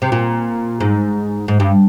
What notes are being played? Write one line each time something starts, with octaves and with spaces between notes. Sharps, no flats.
C3
A#2
G#2
G#2
G2